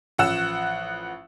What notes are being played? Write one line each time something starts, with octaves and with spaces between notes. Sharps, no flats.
A1 F3 F#5 E6 E7